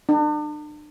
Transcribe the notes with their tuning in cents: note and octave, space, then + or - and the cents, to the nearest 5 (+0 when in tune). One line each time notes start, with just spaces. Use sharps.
D4 +40